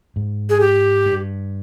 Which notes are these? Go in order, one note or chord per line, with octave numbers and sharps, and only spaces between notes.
G#2
G#4
G4
G2